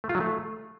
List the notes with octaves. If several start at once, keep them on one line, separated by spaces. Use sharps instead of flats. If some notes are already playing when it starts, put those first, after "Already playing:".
A3
F4
F#3
A3